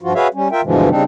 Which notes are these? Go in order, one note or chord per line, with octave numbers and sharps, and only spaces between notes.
G2 F3 F4 F#4
F#4 G#4 B4 C#5 E5 F5
G3 C#4
F4 A#4 E5 G5
G2 B2 D3 E3 F3 G#3
C#3 G3 C4 D4 D#4